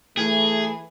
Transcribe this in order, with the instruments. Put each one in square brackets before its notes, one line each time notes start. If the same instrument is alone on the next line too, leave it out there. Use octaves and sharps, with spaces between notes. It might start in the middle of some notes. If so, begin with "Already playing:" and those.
[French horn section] E3 [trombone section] A3 [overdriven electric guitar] G#4